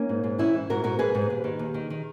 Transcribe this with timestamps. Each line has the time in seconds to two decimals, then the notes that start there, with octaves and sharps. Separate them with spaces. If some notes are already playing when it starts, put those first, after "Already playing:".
Already playing: A#3 C#4
0.09 G#2
0.24 G#2
0.38 E3 C#4 E4
0.54 G#2
0.70 G#2 F#4 A#4
0.84 G#2 F#4 A#4
0.99 G#2 G#4 B4
1.15 G#2
1.30 D#2
1.44 D#3
1.59 D#2
1.74 D#3
1.90 D#3